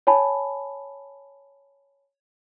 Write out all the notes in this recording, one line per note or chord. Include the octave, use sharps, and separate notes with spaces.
C#5 G#5 A5 B5